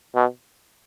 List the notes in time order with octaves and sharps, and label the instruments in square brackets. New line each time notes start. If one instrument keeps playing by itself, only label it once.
[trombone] B2